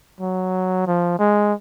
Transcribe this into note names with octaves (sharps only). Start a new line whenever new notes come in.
F#3
F3
G#3